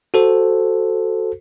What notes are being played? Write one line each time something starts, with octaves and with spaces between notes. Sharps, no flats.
F#4 A4 C5